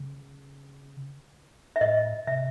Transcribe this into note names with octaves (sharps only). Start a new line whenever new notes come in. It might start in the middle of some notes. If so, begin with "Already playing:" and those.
Already playing: C#3
E5
A2 D#5
C3 E5